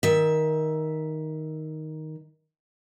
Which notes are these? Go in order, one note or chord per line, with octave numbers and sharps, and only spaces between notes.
D#3 E5